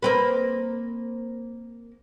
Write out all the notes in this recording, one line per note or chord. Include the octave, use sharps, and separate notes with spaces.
A#3 C4 B4